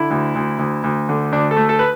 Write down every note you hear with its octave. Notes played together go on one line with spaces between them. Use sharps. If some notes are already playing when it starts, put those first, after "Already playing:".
Already playing: D3 E4
D2
D2
D2
D2
D3
D2 D4
A4
A3
A4
B4